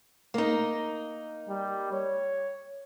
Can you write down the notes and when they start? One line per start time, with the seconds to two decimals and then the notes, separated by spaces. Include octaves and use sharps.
0.34 A#3 D#4
1.49 G3
1.92 C#5